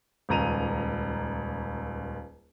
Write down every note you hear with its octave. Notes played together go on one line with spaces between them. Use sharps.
D#1 C#2 A#5 D#7 F7